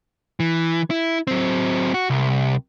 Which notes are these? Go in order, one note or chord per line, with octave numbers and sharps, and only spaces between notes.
E3
E4
F#3 C4
F#4
C2